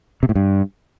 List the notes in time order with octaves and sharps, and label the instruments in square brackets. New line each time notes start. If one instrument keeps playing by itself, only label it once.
[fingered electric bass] C3
A2
G2